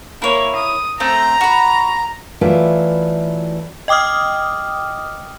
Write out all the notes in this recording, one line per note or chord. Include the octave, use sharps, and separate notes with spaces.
A#3 E4 C#5
D#6
A3 C4 C5 A#5
F#4 B5
E3 F#3 A3 E4 F4 D5
D#5 G5 D6 D#6 F6